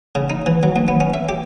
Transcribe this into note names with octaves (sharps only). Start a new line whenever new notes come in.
C#3
D#4
E3
F#3
D#2
B3
C#4
E5
G4